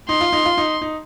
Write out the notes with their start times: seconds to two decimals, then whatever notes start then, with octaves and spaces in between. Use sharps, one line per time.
0.09 D#4 C6
0.21 F4
0.33 D#4
0.45 F4
0.58 D#4
0.82 D#4